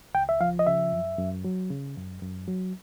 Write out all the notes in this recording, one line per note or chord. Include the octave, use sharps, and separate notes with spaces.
C#2 G5
E5
F3 F5
D#5
C#3 E5
F#2
F#2
F#3
C#3
F#2
F#2
F#3